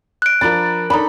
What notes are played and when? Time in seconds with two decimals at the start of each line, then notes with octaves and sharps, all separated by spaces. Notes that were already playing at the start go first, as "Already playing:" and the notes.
0.22 F#6 D7
0.41 F3 D4 A#4 B5 A6
0.90 D4 D#4 A4 B5